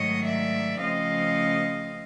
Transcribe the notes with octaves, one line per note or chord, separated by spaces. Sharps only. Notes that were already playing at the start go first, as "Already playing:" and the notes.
Already playing: G#2 D#3 F#3 A3 C#5 D#5
D5 E5
C#3 F3 A3 C4 D#5 F5